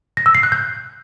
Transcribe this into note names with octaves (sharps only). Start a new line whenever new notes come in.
A#6
E6
C7
F#6
G6